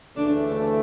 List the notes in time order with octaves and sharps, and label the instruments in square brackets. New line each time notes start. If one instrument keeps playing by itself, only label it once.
[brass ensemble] D2 C#3 E3 A3 [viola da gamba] D4